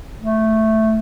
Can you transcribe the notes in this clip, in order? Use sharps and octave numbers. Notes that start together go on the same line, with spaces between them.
A3